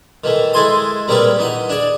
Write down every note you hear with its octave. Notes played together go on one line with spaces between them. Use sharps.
D#3 E3 A3
G#3 E4 A4 G#5 C6 D#6
G3 A#3 C4 F4 G#4 B4
E3 D#4 F#5
D4 G#4 D5